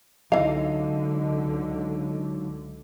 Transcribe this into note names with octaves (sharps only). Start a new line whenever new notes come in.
C#2 D3 E3 F#3 D#4 D#5 F5